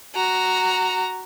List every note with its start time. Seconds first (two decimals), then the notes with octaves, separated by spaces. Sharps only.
0.15 F#4 A#5